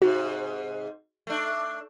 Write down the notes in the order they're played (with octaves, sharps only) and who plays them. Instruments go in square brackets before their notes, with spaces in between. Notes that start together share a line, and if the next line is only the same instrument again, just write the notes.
[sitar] G#2 C3 [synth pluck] F#4
[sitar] A3 D4